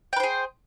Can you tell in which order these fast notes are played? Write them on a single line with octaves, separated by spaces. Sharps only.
G5 B4 C5 G#4